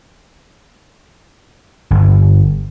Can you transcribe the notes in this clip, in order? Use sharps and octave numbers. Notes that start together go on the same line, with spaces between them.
G1